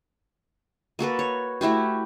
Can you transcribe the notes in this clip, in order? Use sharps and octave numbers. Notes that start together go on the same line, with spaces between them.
A#3 F#4 A4 B4
C#5
A3 E4 F#4 G4